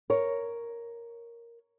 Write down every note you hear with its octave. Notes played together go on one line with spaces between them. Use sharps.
A#4 C#5